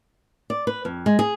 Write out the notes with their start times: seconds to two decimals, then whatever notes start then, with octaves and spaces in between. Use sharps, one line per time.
0.50 D5
0.67 B4
0.85 F2
1.06 G#3
1.19 G#4